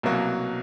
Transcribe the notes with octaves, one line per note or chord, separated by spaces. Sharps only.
C2 B2 F#3 A#3